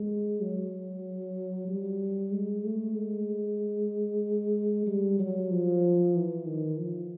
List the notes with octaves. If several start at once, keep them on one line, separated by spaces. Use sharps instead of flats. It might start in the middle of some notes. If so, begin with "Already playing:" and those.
Already playing: G#3
F#3
G3
G#3
A3
G#3
G3
F#3
F3
E3
D#3
F3